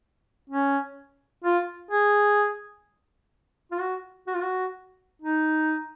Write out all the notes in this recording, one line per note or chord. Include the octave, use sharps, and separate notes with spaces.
C#4
F4
G#4
F4
F#4
F#4
F4
F#4
D#4